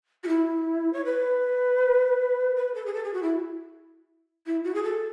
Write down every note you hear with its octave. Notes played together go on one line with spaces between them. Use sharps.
F#4
E4
C#5
B4
B4
A4
G#4
A4
G#4
F#4
E4
E4
F#4
G#4
A4